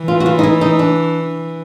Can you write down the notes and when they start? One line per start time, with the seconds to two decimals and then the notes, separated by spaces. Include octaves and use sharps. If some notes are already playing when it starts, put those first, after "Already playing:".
Already playing: E3
0.08 F4
0.20 F#4
0.26 F4
0.39 D#4
0.43 E4
0.61 D#4
0.79 D4